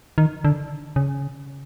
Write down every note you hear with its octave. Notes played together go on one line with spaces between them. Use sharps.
D#3
D3
C#3